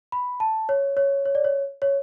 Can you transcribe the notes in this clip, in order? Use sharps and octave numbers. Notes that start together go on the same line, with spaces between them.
B5
A5
C#5
C#5
C#5
D5
C#5
C#5